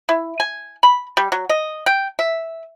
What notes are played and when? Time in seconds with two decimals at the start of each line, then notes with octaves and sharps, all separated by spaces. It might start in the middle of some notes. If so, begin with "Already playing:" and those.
0.09 E4
0.40 G#5
0.83 B5
1.17 G3
1.32 F#3
1.49 D#5
1.86 G5
2.19 E5